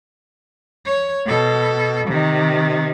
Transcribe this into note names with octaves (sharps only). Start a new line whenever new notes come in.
C#5
B2 A4
C3 D#3